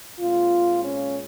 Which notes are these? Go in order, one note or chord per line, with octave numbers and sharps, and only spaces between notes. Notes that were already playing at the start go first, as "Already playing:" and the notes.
A#2 G#3 C4 F4
C#4